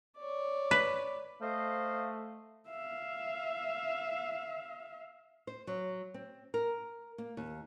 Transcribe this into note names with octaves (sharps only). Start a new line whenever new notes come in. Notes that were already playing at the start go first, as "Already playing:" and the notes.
C#5 D5
B4
A3 C5 D#5 F5
E5 F5
C5
F#3
C4
A#4
A#3
D#2